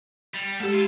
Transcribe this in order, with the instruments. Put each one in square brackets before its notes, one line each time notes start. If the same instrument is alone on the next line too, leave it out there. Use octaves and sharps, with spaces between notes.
[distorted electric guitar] G3
[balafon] G#3 G4 [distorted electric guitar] A4
[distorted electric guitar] E4 F4